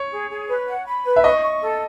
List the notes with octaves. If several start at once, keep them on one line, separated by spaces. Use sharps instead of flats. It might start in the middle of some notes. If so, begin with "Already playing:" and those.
Already playing: C#5
G#4
G#4
B4
F#5
B5
B4
E5
D#5 C#6
C#6
A4